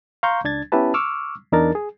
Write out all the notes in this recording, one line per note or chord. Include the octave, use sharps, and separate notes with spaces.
F5 A#5 C6 C#6 G6
C#2 D4 G#6 A6
B3 C#4 E4 G4 B4 A5
C#6 D6 E6 F6
E2 D4 D#4 A#4 A6
G#4